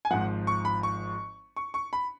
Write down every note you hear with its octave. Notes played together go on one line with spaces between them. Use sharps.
G#5
G#1 G#2 F3 F#5
C#6
B5
C#6
C#6
C#6
B5